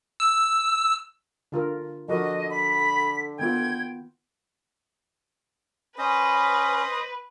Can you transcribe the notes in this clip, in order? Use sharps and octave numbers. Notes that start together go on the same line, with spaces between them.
E6
D3 F4 A#4
D3 F3 F#4 A#4 D#5
B5 B6
D#3 B3 F4 G5 G#6
C#4 B4 C5 D#5 D#6